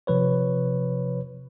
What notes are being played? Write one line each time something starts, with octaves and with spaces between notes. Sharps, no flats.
C3 F3 B4 C#5